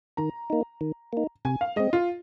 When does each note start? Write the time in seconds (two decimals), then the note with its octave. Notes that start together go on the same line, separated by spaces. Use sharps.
0.17 D#3 A#5
0.50 A#3 D#4
0.81 D#3
1.13 A#3 D#4
1.45 C3 G#5
1.61 F5
1.76 G#3 C4 D#5
1.93 F4